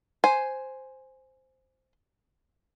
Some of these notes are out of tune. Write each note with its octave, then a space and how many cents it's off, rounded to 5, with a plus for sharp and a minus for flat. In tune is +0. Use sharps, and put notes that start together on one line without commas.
C5 +0 G#5 +0